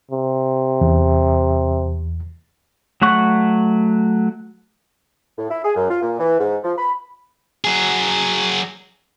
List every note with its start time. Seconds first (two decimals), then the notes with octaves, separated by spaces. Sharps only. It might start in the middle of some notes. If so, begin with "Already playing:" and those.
0.11 C3
0.81 E2
3.02 F#3 A3 F#5 C#6
5.38 A2
5.50 E4
5.65 G#4
5.76 F#2
5.90 F4
6.02 A#2
6.20 E3
6.40 G#2
6.64 F3
6.78 B5
7.65 F#3 G#4